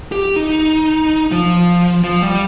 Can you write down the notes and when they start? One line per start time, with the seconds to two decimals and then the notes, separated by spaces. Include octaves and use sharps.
0.12 G4
0.36 D#4
1.32 F3
2.04 F3
2.22 G3